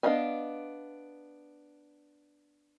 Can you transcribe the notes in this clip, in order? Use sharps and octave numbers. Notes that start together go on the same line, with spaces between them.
B3 D4 D#5 F5 G#5